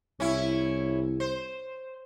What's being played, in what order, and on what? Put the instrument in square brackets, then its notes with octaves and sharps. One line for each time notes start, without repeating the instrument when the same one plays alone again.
[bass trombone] C2 [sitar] C#4 E4
[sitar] C5